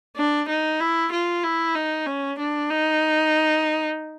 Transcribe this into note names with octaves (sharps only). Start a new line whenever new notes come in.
D4
D#4
E4
F4
E4
D#4
C#4
D4
D#4